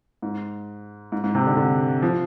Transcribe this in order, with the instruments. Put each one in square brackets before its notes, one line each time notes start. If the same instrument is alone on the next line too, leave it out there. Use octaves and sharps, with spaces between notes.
[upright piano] G#2
G#2
G#2
C3
D3
D3
F3